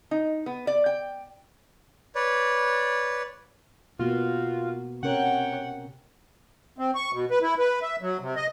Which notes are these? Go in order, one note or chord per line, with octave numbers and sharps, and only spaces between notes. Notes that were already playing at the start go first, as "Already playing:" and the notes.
D#4
B3
D5
G5
B4 C#5 D5
B2 A#3 B3 F4 F#4
C3 C#4 A#4 C#5 F#5 G5
C4
C#6
B2
B4
E4
B4
E5
F#3
C3
D#5